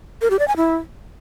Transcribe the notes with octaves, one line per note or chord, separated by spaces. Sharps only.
A#4
G4
D5
G#5
E4